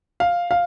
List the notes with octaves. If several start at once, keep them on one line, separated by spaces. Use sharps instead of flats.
F5
F5